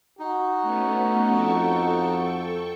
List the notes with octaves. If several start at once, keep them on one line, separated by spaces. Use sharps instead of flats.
D#4 F#4
A3 B3 C#4
F2 A4 G5 C#6